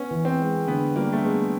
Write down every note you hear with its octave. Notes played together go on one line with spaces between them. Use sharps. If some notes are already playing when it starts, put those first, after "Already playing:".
Already playing: B3 C#4
E3
C4
G#3
D3 B3
G3 A#3
A3
G#3 B3